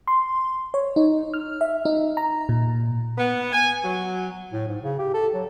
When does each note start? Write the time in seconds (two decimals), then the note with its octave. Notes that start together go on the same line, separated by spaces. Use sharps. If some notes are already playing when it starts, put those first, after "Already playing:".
0.07 C6
0.74 C#5
0.96 D#4
1.34 F6
1.61 E5
1.85 D#4
2.17 A#5
2.49 A#2
3.18 B3
3.52 G#5
3.84 F#3
4.53 A2
4.67 G#2
4.83 C#3
4.99 G4
5.14 A4
5.34 F#3